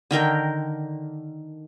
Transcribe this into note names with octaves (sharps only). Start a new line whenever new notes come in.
D3 D#3 A#4 G5